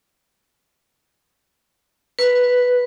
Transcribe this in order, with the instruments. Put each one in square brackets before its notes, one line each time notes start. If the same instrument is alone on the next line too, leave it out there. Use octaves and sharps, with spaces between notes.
[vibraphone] B4